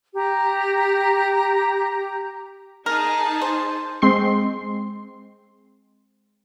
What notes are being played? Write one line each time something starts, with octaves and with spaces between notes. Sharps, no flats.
G4 A#5
D#4 G#4 A#4 A5
C5
G#3 C4 C6 C7